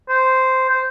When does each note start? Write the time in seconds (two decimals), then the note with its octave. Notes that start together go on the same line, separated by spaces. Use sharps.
0.09 C5
0.69 C5